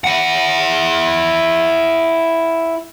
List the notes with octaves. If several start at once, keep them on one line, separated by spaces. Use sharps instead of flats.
E4 F#5